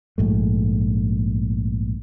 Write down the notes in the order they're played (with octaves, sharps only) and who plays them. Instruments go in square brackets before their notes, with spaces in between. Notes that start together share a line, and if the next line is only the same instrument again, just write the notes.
[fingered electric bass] A#1 G#2 A3